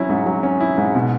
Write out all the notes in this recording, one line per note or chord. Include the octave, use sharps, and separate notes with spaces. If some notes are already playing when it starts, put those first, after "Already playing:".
Already playing: F#3 C#4 E4
G#2
F#3
C#4
E4
G#2
B2